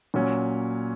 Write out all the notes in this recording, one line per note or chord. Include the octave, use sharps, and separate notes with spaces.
A#2 F#3 C#4